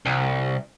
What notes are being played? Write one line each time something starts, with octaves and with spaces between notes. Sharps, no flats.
C2